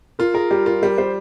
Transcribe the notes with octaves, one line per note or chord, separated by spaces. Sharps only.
F4 A#4
G#4 A#4
G3 G4
F4 A#4
G3 A#4
G3 C5